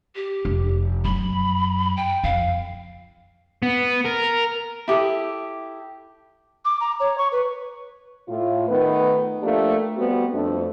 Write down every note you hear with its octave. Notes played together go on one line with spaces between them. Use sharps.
G4
F1
F#2 B5
G5
F2 F5
B3
A#4
E4 G4 A4 D#6
D6
A#5
C#5
C#6
B4
A2 F4
D#3 A3 B3 A#4 B4
F3 A3 A#3 D4 G4
G3 B3 C4 F#4
F2 A3 D4